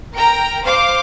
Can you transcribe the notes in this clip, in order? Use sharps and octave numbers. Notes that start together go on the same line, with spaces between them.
A#4 G5 A#5 D7
C5 F5 D6